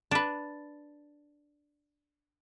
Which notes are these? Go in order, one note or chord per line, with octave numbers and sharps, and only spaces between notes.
D4 B4